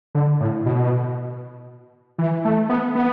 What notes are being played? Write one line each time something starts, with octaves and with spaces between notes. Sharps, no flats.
D3
A2
B2
E3
A3
B3
B3